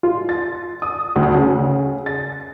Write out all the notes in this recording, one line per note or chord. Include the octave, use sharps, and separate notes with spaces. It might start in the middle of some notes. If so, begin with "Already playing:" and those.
F4
A6
D#6
D2
C#3
A6